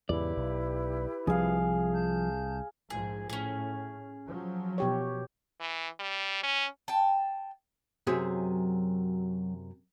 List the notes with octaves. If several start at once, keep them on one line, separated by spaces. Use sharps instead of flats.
E2 G#2 C#3 E4 G4 B4 D5
B1
C2 F3 G#4 F5
A5 G6
A#1 G#2 F3 G#4
A2 C#4 G#4
F3 F#3
B2 G4 C#5
E3
G3
C#4
G5 A5
F#2 C3 F#3 G#4